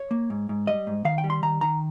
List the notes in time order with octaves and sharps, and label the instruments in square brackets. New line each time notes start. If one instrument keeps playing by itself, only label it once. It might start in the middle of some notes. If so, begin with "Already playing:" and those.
Already playing: [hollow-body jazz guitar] C#5
A#3
G#2
G#2
G3 D#5
G#2
D#3 F5
G5
G3
C6
D#3 A#5
D#3 A#5